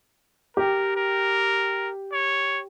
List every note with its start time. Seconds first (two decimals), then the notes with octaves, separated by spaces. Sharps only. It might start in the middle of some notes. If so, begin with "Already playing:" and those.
0.57 G4 A#4
0.96 A#4
2.12 C#5